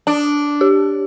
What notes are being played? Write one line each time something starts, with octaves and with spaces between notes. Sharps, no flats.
D4 A5
G4